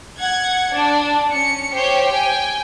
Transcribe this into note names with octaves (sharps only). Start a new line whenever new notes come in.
F#5 G#6
D4
C#4 C#7
G4 C5 C#5
G5 G#5